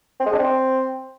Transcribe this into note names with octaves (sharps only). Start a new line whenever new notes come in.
C4
G#3
D4
C4